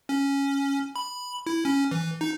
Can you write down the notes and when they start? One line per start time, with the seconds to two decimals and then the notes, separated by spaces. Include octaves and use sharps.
0.09 C#4
0.96 B5
1.46 E4
1.65 C#4
1.91 E3
2.21 D#4